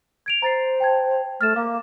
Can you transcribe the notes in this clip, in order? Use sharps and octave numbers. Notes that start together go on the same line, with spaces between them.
G#6 D7 F7
C5 A#5 A6 C7
G5 A5 G#6
A3 F6 A6 E7
A#3 F5 D6